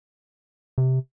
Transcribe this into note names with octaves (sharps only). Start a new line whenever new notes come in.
C3